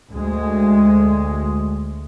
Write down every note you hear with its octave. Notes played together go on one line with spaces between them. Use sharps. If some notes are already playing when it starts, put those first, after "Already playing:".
D2 G#3